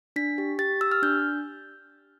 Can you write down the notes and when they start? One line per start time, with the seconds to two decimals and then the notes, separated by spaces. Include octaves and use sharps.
0.16 D4 B6
0.38 G4
0.59 G4 A6
0.81 G4 E6
0.92 F6
1.03 D4 G6